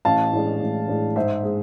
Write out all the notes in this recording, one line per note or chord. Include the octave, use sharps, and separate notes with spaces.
A1 F5 A5
A2 G#3 D4
A1
A2 G#3 D4
G#2 C5 E5
G#3